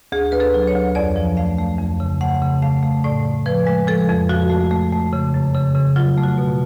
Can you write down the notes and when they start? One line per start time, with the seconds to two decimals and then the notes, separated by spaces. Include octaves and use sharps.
0.12 D2 G#4
0.32 D2 B4
0.40 A4
0.54 F#3
0.67 C#5
0.74 D2
0.95 F2 D5
1.16 F3
1.37 A3 F5
1.59 A3
1.79 F2
2.00 C#3
2.21 A3 F#5
2.42 C#3
2.62 A3 F5
2.83 A3
3.04 A2 D5
3.25 A2
3.46 F3 B4
3.67 G#3
3.87 F3 A4
4.08 F2
4.29 F3 F#4
4.50 A3
4.71 A3
4.92 A3
5.13 C#3
5.34 F#2
5.54 C#3
5.75 C#3
5.96 F#3 F4
6.18 A3
6.23 F#4
6.38 B2